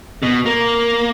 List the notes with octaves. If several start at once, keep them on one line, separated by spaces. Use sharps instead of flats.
B2
A#3